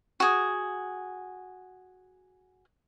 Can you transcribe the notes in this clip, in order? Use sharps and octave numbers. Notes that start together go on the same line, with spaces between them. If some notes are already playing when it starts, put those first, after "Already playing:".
F#4 G#4